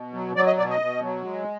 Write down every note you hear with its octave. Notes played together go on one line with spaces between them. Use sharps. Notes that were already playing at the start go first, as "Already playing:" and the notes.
Already playing: B2
F#3
F#3 D5
D#5
B2 D5
D#5
B2
F#3
G#3